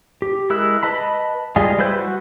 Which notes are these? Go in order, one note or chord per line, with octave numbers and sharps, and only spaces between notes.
G4
G#3 E4 A#4 E6 F#6
B4 D#5 A5 B5
G3 G#3 F4 G#4
G3 E4 B4 C5 G6
F#4